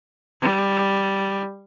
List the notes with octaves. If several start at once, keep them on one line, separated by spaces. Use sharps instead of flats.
G3